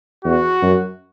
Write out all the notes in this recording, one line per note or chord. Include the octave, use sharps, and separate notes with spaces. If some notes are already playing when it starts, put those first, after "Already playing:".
E2 F#4
F#2